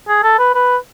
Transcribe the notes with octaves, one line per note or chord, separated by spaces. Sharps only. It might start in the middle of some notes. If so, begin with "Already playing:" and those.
G#4
A4
B4
B4